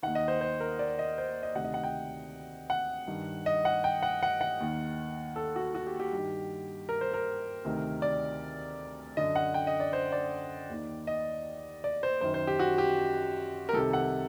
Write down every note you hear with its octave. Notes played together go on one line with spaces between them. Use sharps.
D#2 D#3 F#5
D#5
C5
C5
A#4
D5
D#5
C5
D#5
D2 C3 D#3 F#5
D#5
F#5
G5
F#5
G2 D#3
D#5
F#5
G5
F#5
F#5
F#5
D#2 D#3
A4
F#4
F#4
G4
G4
G2 D#3
A#4
C5
A#4
D2 C3 D#3
D5
F#2 D3 D#5
F#5
G5
D#5
D5
C5
D5
D#2 D#3
D#5
D5
C5
F#2 D#3 C5
C5
G4
F#4
G4
A#4
C2 C3 D#3 A4
F#5